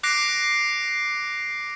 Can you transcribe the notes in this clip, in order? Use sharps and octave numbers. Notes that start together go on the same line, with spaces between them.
D6 F#6 A#6 C7 D7